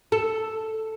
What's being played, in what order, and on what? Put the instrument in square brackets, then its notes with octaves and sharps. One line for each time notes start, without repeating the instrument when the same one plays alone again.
[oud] A4